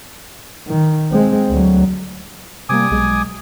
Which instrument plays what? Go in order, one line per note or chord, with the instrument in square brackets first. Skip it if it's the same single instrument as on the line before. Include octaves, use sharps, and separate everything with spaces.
[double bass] D#3
G#3 C4
D2 F#3
[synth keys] C3 G3 A#3 [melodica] G#5 D6 D#6
[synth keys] B1 G#3